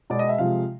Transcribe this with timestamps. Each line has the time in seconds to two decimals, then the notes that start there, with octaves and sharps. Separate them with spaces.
0.10 B2 G#3 D5
0.19 D#5
0.29 E5
0.38 C3 F3 G#3 F5